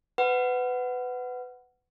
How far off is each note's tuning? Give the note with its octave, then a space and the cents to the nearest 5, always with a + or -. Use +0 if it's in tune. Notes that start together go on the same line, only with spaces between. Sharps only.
B4 +25 F#5 +5